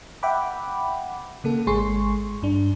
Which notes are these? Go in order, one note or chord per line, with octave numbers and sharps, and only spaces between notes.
E5 F#5 G5 B5 D6
C#3 A#3 A4
G#1 G#3 G#4 C6 C#6
G2 D4